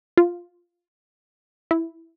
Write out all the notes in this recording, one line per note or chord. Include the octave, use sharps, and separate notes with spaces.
F4
E4